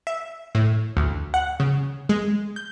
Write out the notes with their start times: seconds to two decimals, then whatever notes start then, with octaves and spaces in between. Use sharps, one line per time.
0.07 E5
0.55 A2
0.97 D2
1.34 F#5
1.60 C#3
2.09 G#3
2.56 G6